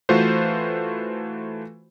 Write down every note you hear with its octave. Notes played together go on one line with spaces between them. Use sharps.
E3 A3 F4 F#4 B4 C5